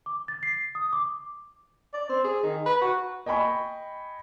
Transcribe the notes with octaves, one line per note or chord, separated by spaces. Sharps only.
D6
A6
C7
D#6
D6
D5
C4
G#4
D#3
B4
F#4
D#5 G5 G#5 B5 C#6